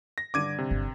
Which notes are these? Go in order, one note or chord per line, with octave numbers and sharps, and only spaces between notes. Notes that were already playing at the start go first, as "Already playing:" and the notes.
A#6
G2 D3 D4 D6 G#6 D#7
C3
G1